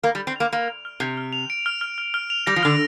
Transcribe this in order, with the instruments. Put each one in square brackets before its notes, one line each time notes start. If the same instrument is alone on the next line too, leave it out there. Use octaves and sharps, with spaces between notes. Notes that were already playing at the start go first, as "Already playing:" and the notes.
[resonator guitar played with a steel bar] A#3 [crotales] F6
[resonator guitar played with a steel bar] G3
[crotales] F6
[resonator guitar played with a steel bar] C4
[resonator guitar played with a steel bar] A#3 [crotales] F7
[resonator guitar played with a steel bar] A#3 [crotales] D7
[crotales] F6
F6
[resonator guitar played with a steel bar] C3 [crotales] F6
[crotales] F6
F7
D7
F6
F6
F6
F6
F7
[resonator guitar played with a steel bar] G3 [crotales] A#6
[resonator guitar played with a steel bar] F3
[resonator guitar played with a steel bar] D3 [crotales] F6